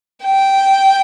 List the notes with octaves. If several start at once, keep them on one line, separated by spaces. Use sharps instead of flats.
G5